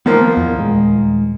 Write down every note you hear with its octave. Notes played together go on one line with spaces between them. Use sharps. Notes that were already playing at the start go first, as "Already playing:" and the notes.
D#3 F3 A#3 B3
E2
D#1 G#3